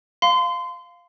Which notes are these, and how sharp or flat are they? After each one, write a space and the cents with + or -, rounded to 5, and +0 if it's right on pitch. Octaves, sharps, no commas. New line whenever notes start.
F5 +0 C6 -30